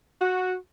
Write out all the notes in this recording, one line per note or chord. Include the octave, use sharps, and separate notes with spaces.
F#4